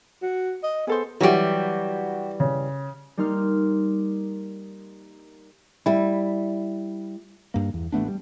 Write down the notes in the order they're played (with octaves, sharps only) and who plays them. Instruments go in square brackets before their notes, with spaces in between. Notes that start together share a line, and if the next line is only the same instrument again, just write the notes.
[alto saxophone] F#4
D#5
[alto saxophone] B3 [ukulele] G#4 A4 C5
[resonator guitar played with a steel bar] E3 G3 [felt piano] F#3 F#4 G4
[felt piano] C#3
[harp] G3 A#3 D#4 C6 F6
[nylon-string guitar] G3 E4
[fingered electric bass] G2 A#3
E2
A1 A3 B3 D4
G3